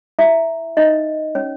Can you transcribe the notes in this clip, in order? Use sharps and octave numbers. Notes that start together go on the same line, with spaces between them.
E4 E5
D#4 D#5
C#4 C#5